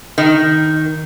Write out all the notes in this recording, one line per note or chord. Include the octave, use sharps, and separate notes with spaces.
D#3